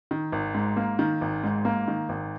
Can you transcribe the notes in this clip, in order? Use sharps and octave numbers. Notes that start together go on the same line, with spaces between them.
D#3
G#1
G#2
A#3
D#3
G#1
G#2
A#3
D#3
G#1